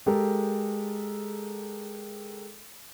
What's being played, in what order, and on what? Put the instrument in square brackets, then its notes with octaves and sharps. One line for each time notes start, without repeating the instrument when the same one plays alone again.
[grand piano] G#3 G4 A4 A#4